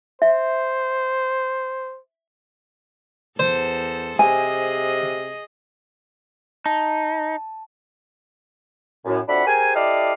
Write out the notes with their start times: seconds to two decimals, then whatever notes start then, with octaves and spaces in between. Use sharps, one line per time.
0.22 C5 E5
3.39 E2 A4 C5
4.19 C3 G#4 D#5 G#5
6.66 D#4 A5
9.05 F#2 A2
9.28 F2 D4 F#4 E5 F#5 B5
9.46 G4 G#4 A#4 C5 G#5
9.75 E4 G4 A4 D5 D#5 F5